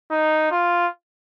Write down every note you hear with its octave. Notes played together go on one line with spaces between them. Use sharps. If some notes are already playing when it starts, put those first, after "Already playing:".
D#4
F4